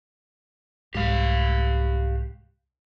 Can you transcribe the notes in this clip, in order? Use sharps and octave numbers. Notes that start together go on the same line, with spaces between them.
C2 G#2 G4 F5